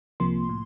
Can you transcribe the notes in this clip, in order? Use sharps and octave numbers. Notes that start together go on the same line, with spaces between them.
C2 C3 F3 A#3 C6
A2